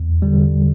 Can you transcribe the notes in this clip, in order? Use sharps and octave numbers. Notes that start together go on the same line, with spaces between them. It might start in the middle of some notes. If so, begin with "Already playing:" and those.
Already playing: E2
D3 G3